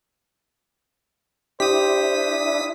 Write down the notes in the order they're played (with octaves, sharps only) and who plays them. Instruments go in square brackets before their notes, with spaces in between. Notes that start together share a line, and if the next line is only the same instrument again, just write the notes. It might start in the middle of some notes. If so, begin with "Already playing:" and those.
[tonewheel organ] D4 E4 [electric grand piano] G4 [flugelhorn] C5 [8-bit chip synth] D#6 B6